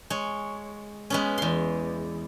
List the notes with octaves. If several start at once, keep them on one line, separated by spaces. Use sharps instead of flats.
G#3 C#5
G#3 B3 C#4
E2 C6